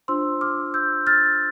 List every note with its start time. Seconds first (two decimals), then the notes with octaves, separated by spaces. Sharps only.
0.08 D4 F4 C5 C6 E6
0.41 D6 F6
0.74 E6 G6
1.07 F6 A6